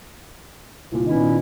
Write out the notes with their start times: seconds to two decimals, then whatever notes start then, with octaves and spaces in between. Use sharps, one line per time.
0.92 C2 A#2
1.06 A#2 D#3 B3 C#4 E4